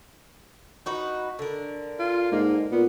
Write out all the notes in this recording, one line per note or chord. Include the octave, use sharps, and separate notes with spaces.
D#4 F#4 B4
D3 A#4
F4
G#2 A#3
A#2 B3